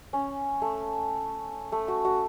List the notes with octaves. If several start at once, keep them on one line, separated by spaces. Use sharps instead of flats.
C#4
A3
A3
F#4
F#4